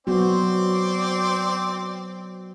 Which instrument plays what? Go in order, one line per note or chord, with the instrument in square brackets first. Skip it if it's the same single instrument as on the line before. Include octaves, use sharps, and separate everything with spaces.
[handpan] F#3 B3 F#4 [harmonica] C4 C5 D5